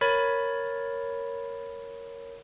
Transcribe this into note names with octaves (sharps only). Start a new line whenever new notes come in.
A#4 C#5 B5 A6